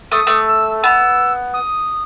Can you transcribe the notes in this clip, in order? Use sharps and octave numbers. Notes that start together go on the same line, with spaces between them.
A3 D#6
A3
E6
B3 E6
D#6